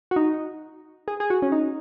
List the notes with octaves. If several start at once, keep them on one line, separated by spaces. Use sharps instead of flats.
F#4
D#4
G#4
G#4
F#4
C#4
D#4